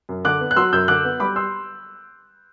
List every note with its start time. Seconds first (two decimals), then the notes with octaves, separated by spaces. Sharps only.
0.09 F#2
0.25 D3 D6 F#6
0.41 B3
0.51 F#6
0.56 F#3 C6 E6
0.73 F#2 E6 G6
0.88 D3 D6 F#6
1.04 B3
1.20 G3 B5 D6
1.36 C6 E6